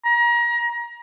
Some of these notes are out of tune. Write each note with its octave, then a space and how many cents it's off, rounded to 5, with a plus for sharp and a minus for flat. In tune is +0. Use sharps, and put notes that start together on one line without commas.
A#5 +30